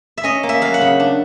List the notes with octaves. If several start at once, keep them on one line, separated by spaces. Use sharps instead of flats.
E5
C#4 D#5
A#3
E5
F#3 F5
F#5
C#3
D4